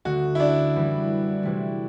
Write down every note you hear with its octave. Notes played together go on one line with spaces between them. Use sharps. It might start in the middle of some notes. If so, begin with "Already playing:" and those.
D2 D3 A3 F#4
E4
D4
F#2 E3 G3
C3 E3 A3 E4 G4